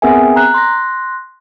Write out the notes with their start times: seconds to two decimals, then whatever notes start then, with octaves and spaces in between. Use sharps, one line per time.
0.02 B3 C4 G#4 A#4 E5 G#5
0.36 A#5 F#6
0.54 C6 F#6 A#6